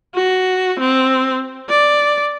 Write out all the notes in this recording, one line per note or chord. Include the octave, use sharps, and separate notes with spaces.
F#4
C4
D5